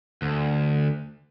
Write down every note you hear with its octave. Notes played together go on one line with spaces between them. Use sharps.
D2